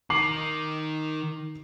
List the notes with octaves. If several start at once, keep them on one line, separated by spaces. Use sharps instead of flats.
D#3 D6 C7 F#7